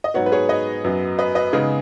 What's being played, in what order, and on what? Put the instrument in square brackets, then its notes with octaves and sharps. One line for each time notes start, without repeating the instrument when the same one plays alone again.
[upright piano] D#5
G#2 F#3 B3 C#5 F#5
B4
G#4 C#5
B4 D#5
F#2 F#3 B3
B4 D#5
B4 D#5
C#3 G#3 B3 D#4 G#4